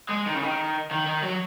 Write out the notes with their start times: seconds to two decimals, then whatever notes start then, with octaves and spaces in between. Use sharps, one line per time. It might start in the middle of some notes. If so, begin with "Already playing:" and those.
0.09 G#3
0.27 D#3
0.35 C#3
0.42 D#3
0.91 D#3
1.06 D#3
1.23 F#3